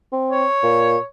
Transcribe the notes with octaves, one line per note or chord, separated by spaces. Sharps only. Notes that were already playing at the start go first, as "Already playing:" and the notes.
C4
C#5
A#2